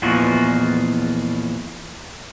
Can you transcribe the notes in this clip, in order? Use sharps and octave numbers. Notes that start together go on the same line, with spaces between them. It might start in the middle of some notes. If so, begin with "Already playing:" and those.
E2 A#2 E3 F3 G#3 F#4